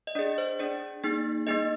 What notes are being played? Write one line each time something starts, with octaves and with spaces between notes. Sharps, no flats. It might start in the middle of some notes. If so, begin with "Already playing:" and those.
D#5
D4 G#4 D5
C5
D4 G#4 D5
A#3 D#4 G#4
A#3 D#4 G#4 D#5